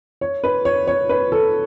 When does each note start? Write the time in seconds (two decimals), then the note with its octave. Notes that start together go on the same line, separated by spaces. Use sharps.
0.21 C#5
0.44 B4
0.65 C#5
0.87 C#5
1.09 B4
1.32 A4